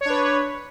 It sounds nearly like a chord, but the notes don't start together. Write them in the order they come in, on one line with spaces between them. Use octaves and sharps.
C#5 D4 B4